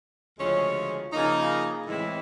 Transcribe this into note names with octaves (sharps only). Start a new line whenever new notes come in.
D2 C#3 F3 G#3 C#4
C#3 F3 A#3 D#4
A2 E3 G#3 C4 E4